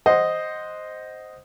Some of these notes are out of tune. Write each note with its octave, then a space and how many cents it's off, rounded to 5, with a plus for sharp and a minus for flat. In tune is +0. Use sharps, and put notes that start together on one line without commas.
C5 +0 D#5 +0 F#5 +0